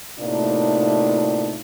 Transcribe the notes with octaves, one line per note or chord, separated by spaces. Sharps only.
A2 C3 A#3 D4 D#4 F4